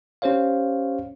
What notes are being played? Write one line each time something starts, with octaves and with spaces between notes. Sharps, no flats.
C#4 G4 C5 C#5 F5